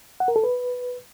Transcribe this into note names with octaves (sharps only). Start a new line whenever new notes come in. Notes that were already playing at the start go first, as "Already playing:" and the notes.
F#5
A#4
A4
B4